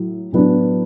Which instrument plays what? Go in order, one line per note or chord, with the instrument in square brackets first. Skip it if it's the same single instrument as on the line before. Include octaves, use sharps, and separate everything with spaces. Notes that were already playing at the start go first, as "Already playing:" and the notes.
Already playing: [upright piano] A2 F#3
A2 F#3 B3 D4